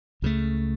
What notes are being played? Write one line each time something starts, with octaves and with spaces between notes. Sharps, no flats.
C#2 C#3 F3 A3